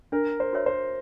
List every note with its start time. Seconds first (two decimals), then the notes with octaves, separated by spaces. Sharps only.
0.12 D4 A#4
0.40 C5
0.53 F#4 A#4 C#5 E5
0.66 C5